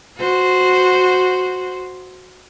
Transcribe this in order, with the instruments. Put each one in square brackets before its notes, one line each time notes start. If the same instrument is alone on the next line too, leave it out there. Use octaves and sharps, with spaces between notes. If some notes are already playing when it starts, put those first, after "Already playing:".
[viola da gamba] F#4 C5